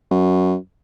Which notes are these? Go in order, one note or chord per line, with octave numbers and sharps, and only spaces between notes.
F#2